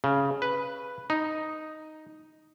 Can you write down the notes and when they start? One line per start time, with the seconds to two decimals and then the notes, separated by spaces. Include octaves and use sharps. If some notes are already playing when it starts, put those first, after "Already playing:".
0.04 C#3
0.42 B4
1.10 D#4